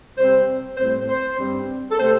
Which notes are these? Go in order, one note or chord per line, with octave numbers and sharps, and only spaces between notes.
C3 G3 C4 C5
A2 G3 C4 C5
C5
G2 G3 C4
A4
C3 A3 C4 C5